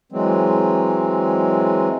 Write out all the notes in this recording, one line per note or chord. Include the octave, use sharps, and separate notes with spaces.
E3 F#3 G#3 C4